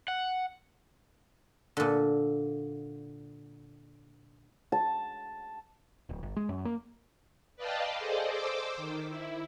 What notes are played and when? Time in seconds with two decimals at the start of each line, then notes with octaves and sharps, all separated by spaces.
0.08 F#5
1.77 A#2 D3
4.72 A5
6.09 D1
6.23 G1
6.36 G#3
6.49 F#2
6.65 A#3
7.56 B4 D5 D#5 F5 G5 A5
7.98 G#4 A4 C5 D5 D#5
8.29 C5 D6 E6
8.77 D#3
9.09 E4